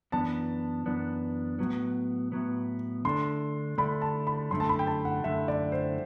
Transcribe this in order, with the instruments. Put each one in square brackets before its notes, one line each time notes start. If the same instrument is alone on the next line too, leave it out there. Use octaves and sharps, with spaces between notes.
[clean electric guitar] F#2 E3 B3 D4 [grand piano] A5
[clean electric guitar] F#2 E3 B3 D4
A2 F#3 B3
A2 F#3 B3
[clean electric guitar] D3 A3 D4 [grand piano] C6
[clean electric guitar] D3 A3 D4 [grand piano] B5
[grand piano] A5
B5
[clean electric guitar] F#2 D3 A3 [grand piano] C6
[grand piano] A5
B5
G5
A5
F#5
[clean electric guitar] F#2 D3 A3 [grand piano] E5
[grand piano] D5
C5